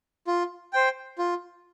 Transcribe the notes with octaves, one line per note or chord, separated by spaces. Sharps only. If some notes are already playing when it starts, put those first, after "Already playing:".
F4
C5 G5
F4